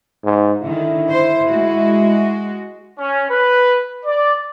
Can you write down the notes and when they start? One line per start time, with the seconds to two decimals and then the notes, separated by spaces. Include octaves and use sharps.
0.24 G#2
0.62 D3 D#3 E4
1.11 C5
1.51 G#3 F#4
2.98 C#4
3.29 B4
4.06 D5